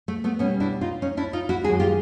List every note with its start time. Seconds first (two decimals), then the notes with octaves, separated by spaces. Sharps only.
0.08 A3
0.24 A3 B3
0.39 B2 G3 B3 C#4
0.60 D4 E4
0.81 D#4 F4
1.02 C#4 D#4
1.17 D4 E4
1.33 D#4 F4
1.49 E4 F#4
1.64 F#2 D#3 G#3 F#4 G#4
1.80 F4 G4